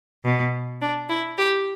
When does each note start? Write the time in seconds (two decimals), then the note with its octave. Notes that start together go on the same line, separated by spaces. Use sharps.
0.24 B2
0.81 D4
1.09 E4
1.38 G4